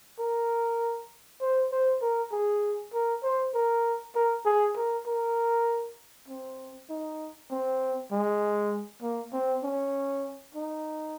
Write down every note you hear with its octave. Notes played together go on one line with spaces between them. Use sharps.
A#4
C5
C5
A#4
G#4
A#4
C5
A#4
A#4
G#4
A#4
A#4
C4
D#4
C4
G#3
A#3
C4
C#4
D#4